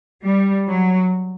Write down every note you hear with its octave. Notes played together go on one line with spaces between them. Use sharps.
G3
F#3